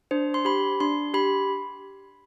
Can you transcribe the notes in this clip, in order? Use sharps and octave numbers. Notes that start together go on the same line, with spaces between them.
D4 C5
C6
G4 B5
D4 C6
G4 B5